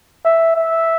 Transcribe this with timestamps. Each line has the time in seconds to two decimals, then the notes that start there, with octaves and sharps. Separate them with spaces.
0.24 E5
0.55 E5